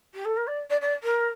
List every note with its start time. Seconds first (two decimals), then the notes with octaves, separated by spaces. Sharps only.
0.14 G4
0.25 A4
0.37 A#4
0.47 D5
0.70 D5
0.81 D5
1.03 A#4